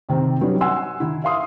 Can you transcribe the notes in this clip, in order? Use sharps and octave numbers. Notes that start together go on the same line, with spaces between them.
C3 D#3 C4
F#3 G3 C#4 D#4 B4
F#5 G#5 C6 E6
D#3 E4
E5 F5 C6 D#6